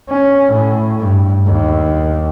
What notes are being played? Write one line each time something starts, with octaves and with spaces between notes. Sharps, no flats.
C#4
A2
G2
D#2